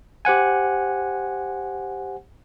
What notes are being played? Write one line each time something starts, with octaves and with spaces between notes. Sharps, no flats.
G4 C5 F#5 G#5